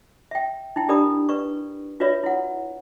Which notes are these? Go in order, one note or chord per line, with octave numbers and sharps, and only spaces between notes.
E5 G5
D#4 E4 G5
D4 G4 A#4 D5 B5 D#6
B4 D5 C#6
F4 F#4 B4 C#5 D5 E5
E4 F#5